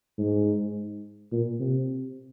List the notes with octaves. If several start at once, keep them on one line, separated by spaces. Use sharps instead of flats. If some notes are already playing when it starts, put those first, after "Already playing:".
G#2
A#2
C3